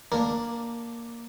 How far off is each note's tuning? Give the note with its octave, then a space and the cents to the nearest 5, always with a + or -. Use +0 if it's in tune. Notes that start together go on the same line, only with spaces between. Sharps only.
A#3 +0 D4 +0